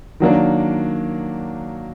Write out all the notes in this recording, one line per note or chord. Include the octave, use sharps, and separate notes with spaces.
D#3 F#3 A#3 D4